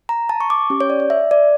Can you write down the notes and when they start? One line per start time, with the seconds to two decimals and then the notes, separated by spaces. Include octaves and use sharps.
0.09 A#5
0.29 A5
0.41 C#6
0.50 D6
0.70 C#4 G4
0.80 C#5
0.90 D5
1.00 D5
1.10 E5
1.31 D5